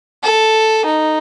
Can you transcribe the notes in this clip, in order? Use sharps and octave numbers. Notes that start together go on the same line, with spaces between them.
A4
D#4